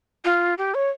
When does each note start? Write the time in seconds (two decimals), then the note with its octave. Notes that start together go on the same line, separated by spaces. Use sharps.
0.25 F4
0.58 G4
0.74 C#5